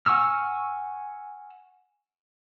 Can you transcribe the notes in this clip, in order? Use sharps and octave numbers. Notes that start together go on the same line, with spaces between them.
F#5 G#5 C#6 E6 F6